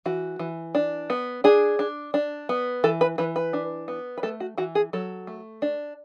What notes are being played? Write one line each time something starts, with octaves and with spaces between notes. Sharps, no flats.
E3 F#4
E3
D4
B3
D4 G#4
D4
D4
B3
E3 A4
B4
E3 B4
B4
D4
B3
B4
A3 A4
F#4
E3 F#4
G#4
F#3 A4
A3
D4